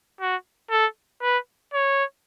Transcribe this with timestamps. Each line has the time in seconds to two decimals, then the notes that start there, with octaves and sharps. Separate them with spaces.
0.21 F#4
0.71 A4
1.23 B4
1.74 C#5